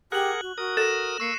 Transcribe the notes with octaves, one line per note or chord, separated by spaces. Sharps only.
G4 G#4 A#4 F#5 F#6 F#7
F#4
F#4 A#4 D#6
A4 A#6 E7
A#3 C#6 E6 C7 C#7